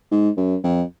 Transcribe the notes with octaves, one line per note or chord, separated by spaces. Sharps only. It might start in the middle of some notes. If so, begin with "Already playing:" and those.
G#2
F#2
F2